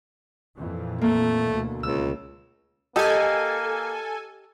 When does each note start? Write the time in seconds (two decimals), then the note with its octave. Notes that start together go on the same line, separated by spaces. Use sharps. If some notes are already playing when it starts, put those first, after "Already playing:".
0.57 F2 A#2 E3
1.01 A3 A#3
1.48 D2 B2
1.83 C#2 E6
2.96 A#3 G4 A4 D#5 G#5